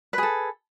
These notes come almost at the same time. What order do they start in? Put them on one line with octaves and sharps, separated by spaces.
B4 G#4 A4